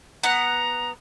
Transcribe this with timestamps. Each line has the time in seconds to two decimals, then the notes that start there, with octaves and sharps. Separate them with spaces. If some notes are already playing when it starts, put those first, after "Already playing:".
0.23 B3 F#5 A#5